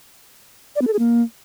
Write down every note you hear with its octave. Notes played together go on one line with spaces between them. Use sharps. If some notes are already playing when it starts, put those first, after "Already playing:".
D5
B3
A4
G#4
A#3